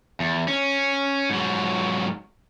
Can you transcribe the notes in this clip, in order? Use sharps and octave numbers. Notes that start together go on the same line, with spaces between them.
E2
C#4
G#2 F#3